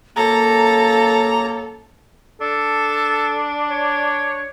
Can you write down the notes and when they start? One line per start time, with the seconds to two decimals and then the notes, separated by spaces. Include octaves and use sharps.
0.16 F#2 A#3 A4 A#5
2.41 D4 A4
3.70 C#5